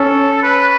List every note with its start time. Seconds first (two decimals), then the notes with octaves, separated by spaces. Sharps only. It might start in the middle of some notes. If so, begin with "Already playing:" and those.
Already playing: C#4 A4 C#5
0.43 B4